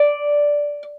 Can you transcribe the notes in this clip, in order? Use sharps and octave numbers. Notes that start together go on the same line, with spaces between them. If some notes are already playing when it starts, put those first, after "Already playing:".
Already playing: D5